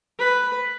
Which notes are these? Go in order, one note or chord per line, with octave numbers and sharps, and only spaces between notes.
B4